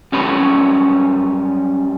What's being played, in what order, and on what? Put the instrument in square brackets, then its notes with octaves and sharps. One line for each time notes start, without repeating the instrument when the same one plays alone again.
[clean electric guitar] F#2 G3 C#4 B4 C#5 B5